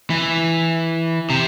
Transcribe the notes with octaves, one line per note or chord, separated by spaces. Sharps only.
E3
C3